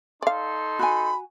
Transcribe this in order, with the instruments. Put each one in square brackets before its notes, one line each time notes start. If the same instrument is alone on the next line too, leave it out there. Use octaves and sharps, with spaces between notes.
[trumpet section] D#4 A4 C6 [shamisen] D5 F5
[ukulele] F#4 G#5 [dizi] B5